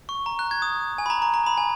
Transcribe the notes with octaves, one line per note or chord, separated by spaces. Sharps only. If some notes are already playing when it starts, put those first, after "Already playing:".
C#6
A#5
F#6
G#6
D#6
G#5
B5
A#5
A#5
A#5
B5
G#5